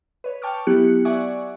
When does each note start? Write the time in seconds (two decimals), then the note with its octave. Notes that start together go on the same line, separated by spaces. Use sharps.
0.24 B4 C#5
0.42 G5 A5 C#6 D6 F6
0.67 F#3 B3 E4 G4 F#6 C#7
1.05 D5 E5 F#5 G#5 C#6 D6